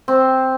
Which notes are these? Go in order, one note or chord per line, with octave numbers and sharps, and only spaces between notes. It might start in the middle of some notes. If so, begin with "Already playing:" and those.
C4